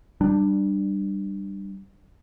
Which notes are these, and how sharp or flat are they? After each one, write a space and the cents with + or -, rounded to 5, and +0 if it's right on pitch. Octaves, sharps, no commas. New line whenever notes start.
G3 +0 D4 +15